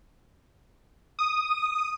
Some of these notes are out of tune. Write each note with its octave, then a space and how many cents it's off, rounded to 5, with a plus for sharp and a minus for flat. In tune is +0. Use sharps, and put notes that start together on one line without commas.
D#6 -5